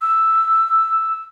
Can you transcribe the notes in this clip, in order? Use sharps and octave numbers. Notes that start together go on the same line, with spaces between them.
E6